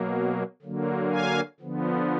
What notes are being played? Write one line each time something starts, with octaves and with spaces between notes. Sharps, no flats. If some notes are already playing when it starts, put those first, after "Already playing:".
Already playing: B2 F#3 A#3
D3 F#3 A#3
F5 G#5
D3 F3 B3